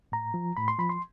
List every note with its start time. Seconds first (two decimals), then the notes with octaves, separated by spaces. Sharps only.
0.12 A2 A#5
0.34 F3
0.57 A2 B5
0.68 C6
0.78 F3 B5
0.89 C6